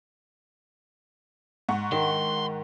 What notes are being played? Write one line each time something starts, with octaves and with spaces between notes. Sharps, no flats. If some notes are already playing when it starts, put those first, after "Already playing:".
G#2 F#5 C#6
D#3 C6